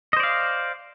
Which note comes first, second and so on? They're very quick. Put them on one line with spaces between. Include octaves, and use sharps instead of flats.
D#5 C5 D5 F5